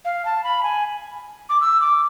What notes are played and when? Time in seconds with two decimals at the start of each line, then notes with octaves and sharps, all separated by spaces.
0.05 F5
0.25 A5
0.44 B5
0.63 G#5
1.49 D6
1.61 E6
1.81 D6